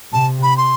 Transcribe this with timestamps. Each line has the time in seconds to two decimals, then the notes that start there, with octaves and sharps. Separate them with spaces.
0.13 C3 A5
0.43 B5
0.57 C6